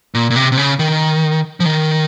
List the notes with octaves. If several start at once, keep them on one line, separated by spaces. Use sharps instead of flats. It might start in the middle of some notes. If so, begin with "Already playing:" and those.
A#2
A#2
C3
C3
C#3
D#3
F3
D#3